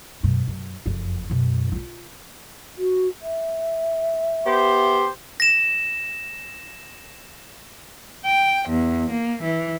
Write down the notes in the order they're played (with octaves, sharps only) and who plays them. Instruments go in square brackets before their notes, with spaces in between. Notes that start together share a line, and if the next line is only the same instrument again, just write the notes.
[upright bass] F#2 B2
F#2
F#1 F2
F#2 B2
D#4 F4
[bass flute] F#4
E5
[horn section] B3 G4 C5
[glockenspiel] A#6 E7
[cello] G5
E2
A#3
E3